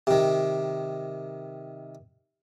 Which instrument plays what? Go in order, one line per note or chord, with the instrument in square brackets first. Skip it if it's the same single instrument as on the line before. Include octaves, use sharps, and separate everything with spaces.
[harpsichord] C3 D#3